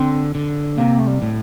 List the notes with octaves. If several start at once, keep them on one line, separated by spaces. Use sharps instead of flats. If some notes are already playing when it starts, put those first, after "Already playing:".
Already playing: D3 C4
D3
C3 A#3
A3
G3
A2